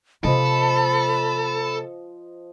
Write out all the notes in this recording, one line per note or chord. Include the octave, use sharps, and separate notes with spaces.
C3 F3 A#3 A4 D#5 B5